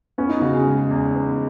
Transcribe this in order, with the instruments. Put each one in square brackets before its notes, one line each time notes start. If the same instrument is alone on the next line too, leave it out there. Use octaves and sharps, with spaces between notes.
[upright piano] B3 [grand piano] C#4
[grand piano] D#4
[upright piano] C#3 [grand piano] F#4
[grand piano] G#4
[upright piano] G#3
E2
B3